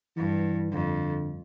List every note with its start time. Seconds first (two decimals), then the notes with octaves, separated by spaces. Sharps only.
0.17 G2 E3
0.72 F2 D3